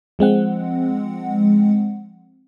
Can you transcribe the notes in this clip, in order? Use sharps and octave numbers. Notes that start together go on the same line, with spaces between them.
F3 G#3 C4 F#5